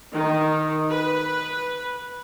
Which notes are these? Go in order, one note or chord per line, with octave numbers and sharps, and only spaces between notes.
D#3
B4